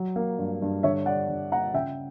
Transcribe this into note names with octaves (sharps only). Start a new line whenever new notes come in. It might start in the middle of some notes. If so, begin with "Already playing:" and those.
Already playing: F#3
A#3
G2
G2
D3 C#5 E5
G3 D5 F#5
G2
A#3 F#5 A#5
C#3 E5 G5